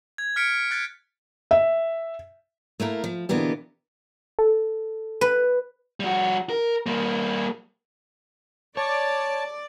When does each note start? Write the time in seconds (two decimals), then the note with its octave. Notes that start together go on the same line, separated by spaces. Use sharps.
0.18 G#6
0.36 F6 B6 C#7 D7
0.71 F#6 G#6 A6
1.51 E5
2.80 A3 A#3 E4 A#4
3.04 F3
3.29 B2 D3 E3 A#3 B3 G4
4.39 A4
5.21 B4
6.00 G3 F#4
6.50 A#4
6.86 G3 A#3
8.77 C#5 D5 A5